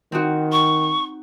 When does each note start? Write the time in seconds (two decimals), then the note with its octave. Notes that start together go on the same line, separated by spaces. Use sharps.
0.12 D#3 C4 D#4 F#4
0.52 C#6